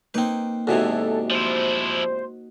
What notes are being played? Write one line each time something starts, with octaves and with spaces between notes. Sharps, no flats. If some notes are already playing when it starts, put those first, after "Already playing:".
A#3 C4 D#4 B4
E2 G#2 C3 F#4 A4 D#5 G#5
F3 E4 C5